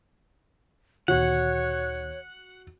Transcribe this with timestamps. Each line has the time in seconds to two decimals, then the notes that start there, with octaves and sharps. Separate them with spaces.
1.08 D2 A#2 D#3 F#4 C#5 F#5